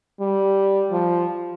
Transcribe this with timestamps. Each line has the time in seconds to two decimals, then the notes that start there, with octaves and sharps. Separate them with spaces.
0.20 G3
0.91 F3